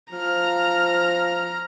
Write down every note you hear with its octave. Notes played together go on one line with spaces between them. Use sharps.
F3 A#5 F6